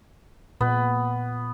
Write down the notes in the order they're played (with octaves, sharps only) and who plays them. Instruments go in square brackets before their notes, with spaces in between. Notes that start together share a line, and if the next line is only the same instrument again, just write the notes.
[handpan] A#2 [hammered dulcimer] B3